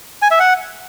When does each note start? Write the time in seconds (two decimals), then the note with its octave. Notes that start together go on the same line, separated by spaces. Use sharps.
0.22 G#5
0.31 E5
0.40 F#5